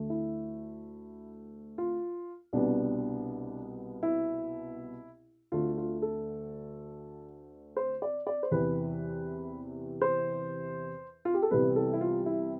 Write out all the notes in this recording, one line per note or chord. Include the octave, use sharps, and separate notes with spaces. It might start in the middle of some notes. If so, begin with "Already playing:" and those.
Already playing: D2 D3 A3
E4
F4
C2 B2 G3 B3 D4
E4
D2 D3 A3 F4
F4
A4
C5
D5
D5
C5
E2 C3 E3 B4
C5
F4
G4
A4
C2 C3 E3 G3 B3 B4
A4
E4
F4
E4